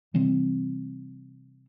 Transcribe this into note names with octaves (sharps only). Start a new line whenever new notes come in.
C3 E3 G3 C4